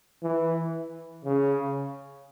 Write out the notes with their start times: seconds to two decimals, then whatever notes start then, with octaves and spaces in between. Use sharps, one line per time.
0.23 E3
1.25 C#3